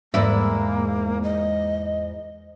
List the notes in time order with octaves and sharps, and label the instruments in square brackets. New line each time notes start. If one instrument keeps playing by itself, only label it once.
[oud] E2 G#2 E4 [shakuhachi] A#3
[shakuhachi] D#5